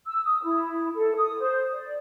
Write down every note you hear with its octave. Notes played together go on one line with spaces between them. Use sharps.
E6
D#6
E4
A4
D#6
C5
D5